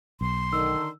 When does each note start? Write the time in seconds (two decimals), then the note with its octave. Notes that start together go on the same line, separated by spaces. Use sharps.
0.21 B1 C6
0.53 D3 D#3 E6